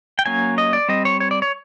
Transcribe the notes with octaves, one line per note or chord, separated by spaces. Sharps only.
G5
F#3 A#3 C#4 G#5
D#5
D5
G3 C4 D#5
C#5
C#5
D5
C#5